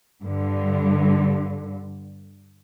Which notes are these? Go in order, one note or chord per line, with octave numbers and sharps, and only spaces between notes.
G2 D3